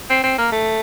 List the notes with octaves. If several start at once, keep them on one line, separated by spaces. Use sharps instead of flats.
C4
C4
A#3
A3